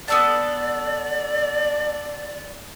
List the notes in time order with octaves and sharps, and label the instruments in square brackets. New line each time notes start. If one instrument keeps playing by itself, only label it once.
[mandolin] B3 A4 A5 [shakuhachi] D5